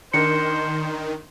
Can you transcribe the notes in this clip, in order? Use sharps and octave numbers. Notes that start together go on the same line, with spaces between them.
D#3 D4 A#4 C5 C#7